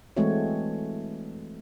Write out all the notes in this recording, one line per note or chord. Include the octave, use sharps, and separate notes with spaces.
E3 G#3 A3 C4 F#4 C#5